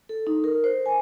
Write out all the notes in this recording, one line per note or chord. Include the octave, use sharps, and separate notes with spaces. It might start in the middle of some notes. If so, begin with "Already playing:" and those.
A4
D#4
A#4
C5
G#5